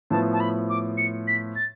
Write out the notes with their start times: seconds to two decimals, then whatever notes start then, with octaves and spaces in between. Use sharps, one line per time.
0.11 A2 F3 B3 A5
0.33 A5
0.40 B5
0.69 D6
0.98 C#7
1.28 B6
1.56 A6